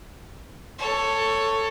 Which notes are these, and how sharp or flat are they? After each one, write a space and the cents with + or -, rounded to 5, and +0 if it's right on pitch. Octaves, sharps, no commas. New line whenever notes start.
A4 +15 C#5 +0